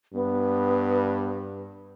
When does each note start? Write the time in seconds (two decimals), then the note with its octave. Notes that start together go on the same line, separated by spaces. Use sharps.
0.14 G2 B3